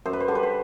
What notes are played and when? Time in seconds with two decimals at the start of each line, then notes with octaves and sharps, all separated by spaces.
0.06 F#2 C5
0.13 B4
0.20 C5
0.28 D3 G3
0.35 B4
0.43 C5